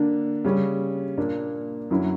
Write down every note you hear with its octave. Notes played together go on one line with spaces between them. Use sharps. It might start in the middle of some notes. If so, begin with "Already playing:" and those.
Already playing: D3 A#3 D4
C#3 G3 C#4
A#2 A#3 D4
F#2 D3 F#3 C#4 E4